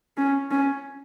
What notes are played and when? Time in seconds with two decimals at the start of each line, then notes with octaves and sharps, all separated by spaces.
0.17 C#4
0.51 C#4